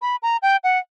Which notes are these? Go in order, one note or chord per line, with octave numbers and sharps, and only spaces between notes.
B5
A#5
G5
F#5